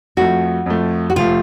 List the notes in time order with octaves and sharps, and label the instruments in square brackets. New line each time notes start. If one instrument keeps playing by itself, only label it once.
[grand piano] F2 F3 A3 [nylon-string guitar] F#4
[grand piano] F2 F3 A3
[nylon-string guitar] F#4
[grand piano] F1 F3 A3 [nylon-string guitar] F4